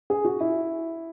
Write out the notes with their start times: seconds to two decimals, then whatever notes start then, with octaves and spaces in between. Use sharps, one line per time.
0.10 G#4
0.25 F#4
0.41 E4